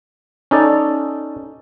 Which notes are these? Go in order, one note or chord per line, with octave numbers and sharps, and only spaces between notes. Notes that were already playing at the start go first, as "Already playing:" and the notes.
C#4 D#4 A4 D5